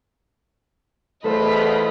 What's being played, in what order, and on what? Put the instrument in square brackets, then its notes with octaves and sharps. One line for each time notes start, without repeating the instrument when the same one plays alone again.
[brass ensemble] E2 B2 F4 [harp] A3 A4 C5 [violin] D#5 B5